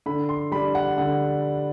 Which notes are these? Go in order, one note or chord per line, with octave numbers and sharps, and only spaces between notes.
D3 B5
C6
G3 D4 B5
F#5
D3 F#5